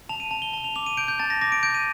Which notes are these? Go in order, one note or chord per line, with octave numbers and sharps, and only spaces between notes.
A5 F7
D#7
A5 F7
G7
A5 G7
F7
D6 F7
D#7
G6 D7
G6
A5 A6
A#6
D6 A#6
D7
G6 D7
D#7